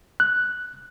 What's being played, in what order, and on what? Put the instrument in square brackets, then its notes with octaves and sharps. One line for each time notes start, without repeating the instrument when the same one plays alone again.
[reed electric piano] F#6